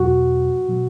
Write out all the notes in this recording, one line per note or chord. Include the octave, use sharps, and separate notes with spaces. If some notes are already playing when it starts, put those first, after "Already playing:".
Already playing: E2 B2 F#3 F#4
B2 F#3